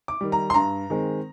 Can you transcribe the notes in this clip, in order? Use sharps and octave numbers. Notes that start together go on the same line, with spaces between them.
D6
D#3 G3
A#5
C6
G2 A#5
D#3 G#3 C4